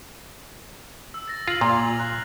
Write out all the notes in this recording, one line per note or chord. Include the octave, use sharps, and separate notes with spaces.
E6
A6 A#6
F4 F6 C7 F#7
A#2 G#6 A6 F7
F#6